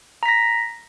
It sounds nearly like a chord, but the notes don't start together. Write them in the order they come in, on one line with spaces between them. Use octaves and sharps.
A#5 B6 A#6